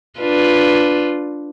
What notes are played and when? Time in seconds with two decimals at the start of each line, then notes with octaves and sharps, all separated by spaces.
0.20 D4 F4 B4